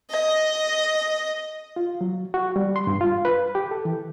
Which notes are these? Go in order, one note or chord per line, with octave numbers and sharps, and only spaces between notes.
D#5
F4
F#3
F#4
G3
C6
G2
F4
B4
G4
A4
E3